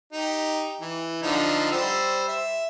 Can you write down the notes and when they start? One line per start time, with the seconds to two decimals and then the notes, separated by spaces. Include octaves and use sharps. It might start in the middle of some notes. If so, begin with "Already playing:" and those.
0.13 D#4 G4
0.81 E3
1.23 D3 F3 D#4
1.72 G3 C5 E6
2.28 E5